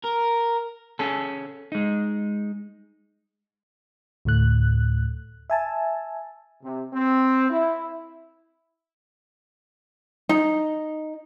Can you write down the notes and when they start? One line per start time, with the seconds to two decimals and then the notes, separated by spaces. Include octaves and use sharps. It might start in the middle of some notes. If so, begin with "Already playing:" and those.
0.05 A#4
0.99 C#4 G#4 A4
1.72 G#3 D#4
4.25 D2 A2 A3 F#6
5.50 E5 G#5 A5
6.63 C3
6.93 C4
7.50 E4
10.29 D#4